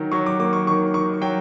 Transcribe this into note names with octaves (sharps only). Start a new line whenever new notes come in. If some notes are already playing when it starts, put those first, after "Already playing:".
Already playing: D#3 F#3
F#3 C#6
D6
A#3 D6
C#6
D#3 C#6
D#3 C#6
F#3 G5